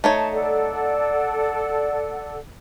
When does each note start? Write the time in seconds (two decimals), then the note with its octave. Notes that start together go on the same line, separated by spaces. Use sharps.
0.04 A3 D#4 C#5 A5
0.32 A4 D5 F#5